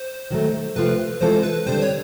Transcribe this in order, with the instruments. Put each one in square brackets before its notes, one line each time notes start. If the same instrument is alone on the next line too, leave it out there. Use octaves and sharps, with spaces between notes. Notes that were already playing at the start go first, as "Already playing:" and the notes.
Already playing: [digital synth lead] C5
[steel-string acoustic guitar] D#3 F#3 A3
[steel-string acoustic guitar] C3 F3 A3 C4 F4 [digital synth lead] B4
[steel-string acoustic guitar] E3 G#3 C4 F4 A4 [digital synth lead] C5
[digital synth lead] B4
[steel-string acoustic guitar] D3 G3 C4 [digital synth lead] C5
[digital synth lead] C#5